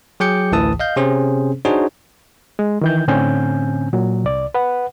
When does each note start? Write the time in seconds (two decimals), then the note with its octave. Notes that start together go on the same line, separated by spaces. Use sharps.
0.20 F#3 G#4 G5 D6 G6 C#7
0.52 A1 D2 A2 E3 A5 D#6
0.80 D#5 F5 G6
0.96 C3 C4 C#4 G#4 C5
1.65 D4 D#4 F#4 G#4 C5 C#5
2.59 G#3
2.81 D#3 E3 G6
3.08 A2 D3 C4 C#4 G#5 G6
3.93 A#2 F#3
4.24 C2 D5
4.54 B4 F#5